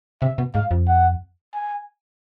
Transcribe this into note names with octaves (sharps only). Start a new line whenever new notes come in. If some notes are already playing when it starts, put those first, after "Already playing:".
C3 E5
B2
G#2 F5
F2
F#5
G#5